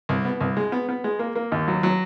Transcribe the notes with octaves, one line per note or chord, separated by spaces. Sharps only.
C2
B3
C2
G#3
B3
B3
G#3
A#3
A#3
D#2
F#3
F#3